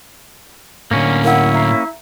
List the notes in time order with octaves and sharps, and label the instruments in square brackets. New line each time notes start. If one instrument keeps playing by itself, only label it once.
[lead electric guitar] A2 D3 [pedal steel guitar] A#3 C#4
[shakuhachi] E4 [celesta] A#4 F5 F#5
[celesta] E5 A#5 C7